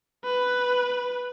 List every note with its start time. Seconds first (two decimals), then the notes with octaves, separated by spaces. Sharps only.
0.24 B4